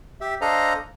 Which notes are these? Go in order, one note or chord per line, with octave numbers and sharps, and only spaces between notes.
G4 E5
D4 A4 C5 D#5 F5 A#5